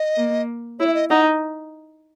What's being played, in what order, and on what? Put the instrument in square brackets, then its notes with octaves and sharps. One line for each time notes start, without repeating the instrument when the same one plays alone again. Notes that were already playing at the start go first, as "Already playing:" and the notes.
Already playing: [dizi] D#5
[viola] A#3
[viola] E4 [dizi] C#5
[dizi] E5
D#5
[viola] D#4 [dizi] F#5